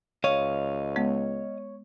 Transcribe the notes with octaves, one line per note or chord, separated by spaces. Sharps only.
C#2 C#5 D#5 F5
G#3 B3